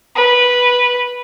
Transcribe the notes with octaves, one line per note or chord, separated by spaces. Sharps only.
B4